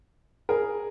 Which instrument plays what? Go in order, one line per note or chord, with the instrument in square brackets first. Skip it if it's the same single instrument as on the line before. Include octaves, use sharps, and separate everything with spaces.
[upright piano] G#4 A#4